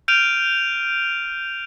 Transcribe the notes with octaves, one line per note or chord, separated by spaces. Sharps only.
F6 G6 D7 D#7 F7